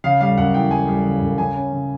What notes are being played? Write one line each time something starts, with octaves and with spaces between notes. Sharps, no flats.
C#3 F5
G3 F5
F#2 F#5
E3 G5
G3 G#5
G3
C#3
F#2
C#3 G#5
C#4
C#3